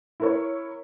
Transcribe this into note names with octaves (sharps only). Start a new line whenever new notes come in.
E4 A#4 C#5